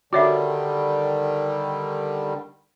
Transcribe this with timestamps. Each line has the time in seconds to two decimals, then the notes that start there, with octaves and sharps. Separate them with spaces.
0.13 D3 D#3 G3 F#4 C#5 E5